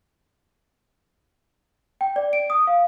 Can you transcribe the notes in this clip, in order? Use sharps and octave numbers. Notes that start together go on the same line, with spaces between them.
G5
D5
D7
D#6
F5